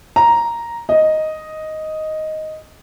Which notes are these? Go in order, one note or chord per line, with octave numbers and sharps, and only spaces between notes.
A#5
D#5